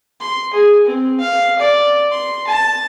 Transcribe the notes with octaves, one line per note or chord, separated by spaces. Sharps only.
C6
G#4
C4
F5
D5
C6
A5